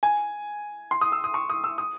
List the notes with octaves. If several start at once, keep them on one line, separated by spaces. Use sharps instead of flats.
G#5
C6
D#6
E6
D#6
C#6
D#6
E6
D#6